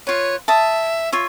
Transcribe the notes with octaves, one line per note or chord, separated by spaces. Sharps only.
F4 B4 C#5
E5 A5 D#6
F4 C#5 E5